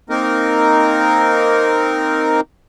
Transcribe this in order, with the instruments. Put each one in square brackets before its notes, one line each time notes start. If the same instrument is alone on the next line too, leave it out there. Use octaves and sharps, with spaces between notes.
[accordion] A#3 C4 D#4 A#4